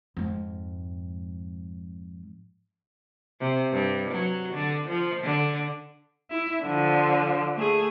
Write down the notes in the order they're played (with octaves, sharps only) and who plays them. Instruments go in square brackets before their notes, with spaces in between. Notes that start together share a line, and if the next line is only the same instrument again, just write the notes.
[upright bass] F2 G#2
[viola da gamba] C3
G2
F#3
D3
F3
D3
[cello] E4
D3 F3
A3 G#4